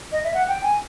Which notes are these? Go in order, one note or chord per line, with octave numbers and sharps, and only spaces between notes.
D#5
E5
F#5
G5
G#5